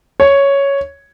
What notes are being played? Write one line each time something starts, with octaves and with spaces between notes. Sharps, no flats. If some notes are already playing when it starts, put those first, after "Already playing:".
C#5